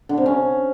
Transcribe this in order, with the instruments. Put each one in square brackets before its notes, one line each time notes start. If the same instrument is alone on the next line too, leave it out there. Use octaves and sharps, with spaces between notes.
[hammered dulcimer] D3
C3
C#4